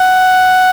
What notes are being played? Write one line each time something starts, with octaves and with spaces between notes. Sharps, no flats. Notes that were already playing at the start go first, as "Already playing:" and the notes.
Already playing: F#5